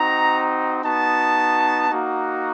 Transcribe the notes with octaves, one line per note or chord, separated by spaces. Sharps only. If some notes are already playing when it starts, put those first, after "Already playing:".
Already playing: C4 D#4 F#4 A#5
B3 D#4 F#4 A5
A#3 D#4 F#4